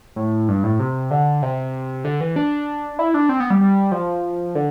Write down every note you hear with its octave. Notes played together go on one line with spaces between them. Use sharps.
A2
G2
A2
C3
D3
C3
D3
E3
D4
E4
D4
C4
B3
G3
G3
F3
D3